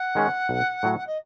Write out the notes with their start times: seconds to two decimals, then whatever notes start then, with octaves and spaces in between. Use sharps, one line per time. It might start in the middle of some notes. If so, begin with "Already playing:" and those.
Already playing: F#5
0.15 D#3 G#3 C#4
0.49 B1
0.83 A2 F#3
1.06 D#5